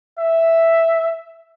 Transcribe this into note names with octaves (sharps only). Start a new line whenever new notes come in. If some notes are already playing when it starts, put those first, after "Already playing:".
E5